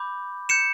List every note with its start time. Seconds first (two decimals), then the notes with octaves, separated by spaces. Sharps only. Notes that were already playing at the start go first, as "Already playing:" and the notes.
Already playing: B5 D6 G6
0.49 G6 C#7 E7